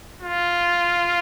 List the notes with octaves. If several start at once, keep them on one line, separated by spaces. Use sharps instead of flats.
F4